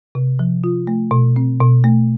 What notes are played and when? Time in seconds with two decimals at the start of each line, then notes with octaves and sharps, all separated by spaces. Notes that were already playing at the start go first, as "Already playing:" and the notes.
0.15 C3
0.39 F3
0.64 F4
0.87 A3
1.11 B2
1.36 C4
1.60 B2
1.84 A3